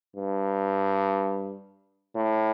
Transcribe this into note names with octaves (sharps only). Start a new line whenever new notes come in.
G2
A2